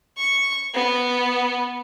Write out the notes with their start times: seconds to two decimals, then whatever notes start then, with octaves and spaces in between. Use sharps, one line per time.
0.17 C#6
0.74 B3